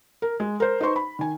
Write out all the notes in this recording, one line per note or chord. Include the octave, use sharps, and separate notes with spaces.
A#4
G#3
A#4 C5
D#4 B4 C5 C6 C#6
B5
D#3 G#5